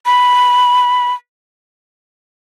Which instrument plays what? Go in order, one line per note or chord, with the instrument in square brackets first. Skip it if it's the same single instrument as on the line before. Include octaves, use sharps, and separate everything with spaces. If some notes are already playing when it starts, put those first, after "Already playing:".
[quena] B5